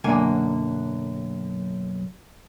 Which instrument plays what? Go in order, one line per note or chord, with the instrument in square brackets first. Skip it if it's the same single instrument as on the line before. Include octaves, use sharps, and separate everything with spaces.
[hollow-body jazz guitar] B1 F#2 D3 A#3 G#5